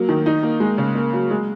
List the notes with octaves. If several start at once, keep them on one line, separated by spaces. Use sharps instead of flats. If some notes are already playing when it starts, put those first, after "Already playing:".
Already playing: F#3 A#3
D#3
D#4
A#3
G#3
C#3
A#3
F#3
G#3